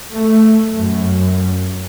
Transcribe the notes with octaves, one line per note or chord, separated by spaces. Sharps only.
A3
F#2